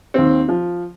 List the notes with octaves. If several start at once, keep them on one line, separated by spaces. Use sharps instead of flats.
D#2 C4
F3